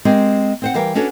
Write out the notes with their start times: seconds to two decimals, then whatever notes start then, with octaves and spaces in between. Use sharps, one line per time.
0.05 G#3 C4 G4 A#4
0.62 C4 C5 F#5
0.74 E3 G3 A#4 F5 G5
0.95 C#4 D4 F#4 A4 B4 C#5